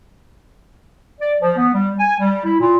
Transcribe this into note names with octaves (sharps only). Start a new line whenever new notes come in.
D5
F3
B3
G3
G#5
G3
E4
A#2